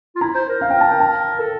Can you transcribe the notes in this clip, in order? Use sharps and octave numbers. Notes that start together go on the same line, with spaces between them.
F4
E4 A#5
C5
A#4
F5
G5
A5
G5
A5
A4